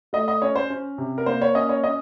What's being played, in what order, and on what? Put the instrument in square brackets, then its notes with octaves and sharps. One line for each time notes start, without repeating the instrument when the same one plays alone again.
[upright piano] A3 D#5
D#5
C#4 C#5
C5
C#4
C3
A#4
A#3 C5
C#5
C#4 D#5
C#5
C#4 D#5